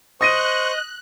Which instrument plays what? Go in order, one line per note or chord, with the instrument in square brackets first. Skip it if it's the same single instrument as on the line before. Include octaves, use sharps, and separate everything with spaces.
[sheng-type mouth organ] C5 C#6 [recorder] D#5 [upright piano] D#6 A#6 D#7 [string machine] F#6